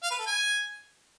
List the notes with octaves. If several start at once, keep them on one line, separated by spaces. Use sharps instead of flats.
F5
B4
A4
G#5